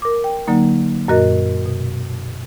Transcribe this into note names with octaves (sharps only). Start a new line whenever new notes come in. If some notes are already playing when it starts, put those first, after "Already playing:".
A#4 D6
G5
D3 F#3 A#3 D#4
F#2 A#2 F#4 A#4 D#5
B2